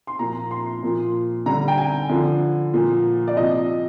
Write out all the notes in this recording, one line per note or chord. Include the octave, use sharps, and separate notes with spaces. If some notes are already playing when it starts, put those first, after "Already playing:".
C6
A#2 F3 A#5
C6
A#2 F3
D3 G3 A#5
G5
G#5
D3 F3
A#2 F3
D5
C3 F3 D#5